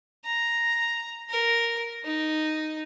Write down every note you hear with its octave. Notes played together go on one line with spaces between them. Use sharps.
A#5
A#4
D#4